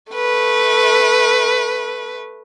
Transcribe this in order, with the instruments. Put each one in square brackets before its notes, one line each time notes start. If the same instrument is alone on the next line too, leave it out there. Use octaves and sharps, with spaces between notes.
[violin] A3 B4